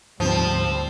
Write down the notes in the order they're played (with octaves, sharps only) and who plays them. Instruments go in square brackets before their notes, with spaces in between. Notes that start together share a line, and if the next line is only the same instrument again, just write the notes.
[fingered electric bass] D2 [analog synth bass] G#2 [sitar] F3 [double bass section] G3 C4